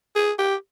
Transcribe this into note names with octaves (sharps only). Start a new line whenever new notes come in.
G#4
G4